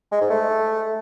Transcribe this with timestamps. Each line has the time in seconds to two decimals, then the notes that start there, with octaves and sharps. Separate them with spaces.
0.12 G#3
0.21 G#2
0.30 A3